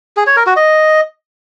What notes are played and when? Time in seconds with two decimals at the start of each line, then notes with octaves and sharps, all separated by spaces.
0.17 G#4
0.27 C#5
0.37 A#4
0.46 F#4
0.56 D#5